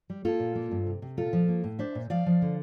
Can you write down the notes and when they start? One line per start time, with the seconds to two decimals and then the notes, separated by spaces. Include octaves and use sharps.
0.10 G3
0.25 A#3 F4 A4
0.40 A#2
0.55 A#3
0.71 G2
0.87 C3
1.02 C3
1.17 A#2 F4 A4
1.33 F3
1.48 A#3
1.64 A2
1.79 D4 C5 E5
1.95 A#2
2.10 F3 D5 F5
2.26 F3
2.42 D3